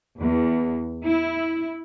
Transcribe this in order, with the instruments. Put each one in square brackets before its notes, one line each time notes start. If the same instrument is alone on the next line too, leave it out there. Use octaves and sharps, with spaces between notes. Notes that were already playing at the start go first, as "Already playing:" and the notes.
[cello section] E2
E4